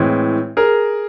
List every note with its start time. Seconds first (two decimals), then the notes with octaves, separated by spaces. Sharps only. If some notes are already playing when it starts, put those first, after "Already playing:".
Already playing: A2 E3 G#3 C4
0.57 G#4 A#4